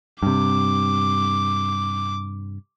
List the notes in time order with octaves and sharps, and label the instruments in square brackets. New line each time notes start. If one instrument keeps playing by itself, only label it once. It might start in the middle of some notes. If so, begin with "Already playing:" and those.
[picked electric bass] G2 C3 [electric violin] D6